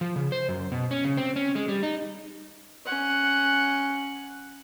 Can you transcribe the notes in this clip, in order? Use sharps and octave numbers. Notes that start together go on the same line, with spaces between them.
F3
C#3
C5
F#2
B2
C#4
C#3
C4
C#4
G#3
G3
D#4
C#4 F#5